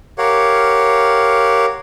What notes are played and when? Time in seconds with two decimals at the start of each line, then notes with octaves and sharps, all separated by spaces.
0.18 G4 A#4 C#5 F5 F#5